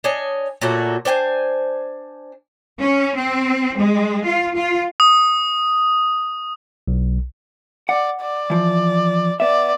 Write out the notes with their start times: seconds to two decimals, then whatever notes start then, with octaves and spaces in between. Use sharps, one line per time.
0.04 D4 C#5 D#5 G#5
0.61 A#2 F#3 A3 F#4
1.05 D4 C5 G5 G#5
2.79 C#4
3.16 C4
3.77 G#3
4.24 F4
4.56 F4
5.00 D#6
6.88 B1
7.89 D5 F#5
8.22 D5
8.50 E3 F3
9.40 B3 D5 E5